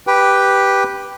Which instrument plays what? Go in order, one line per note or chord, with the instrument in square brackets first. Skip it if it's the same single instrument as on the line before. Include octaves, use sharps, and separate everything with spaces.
[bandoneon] G4 B4 G5